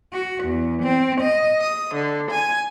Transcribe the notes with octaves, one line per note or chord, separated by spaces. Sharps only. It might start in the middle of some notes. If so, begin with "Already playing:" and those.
F#4
E2
C4
D#5
D#6
D3
G#5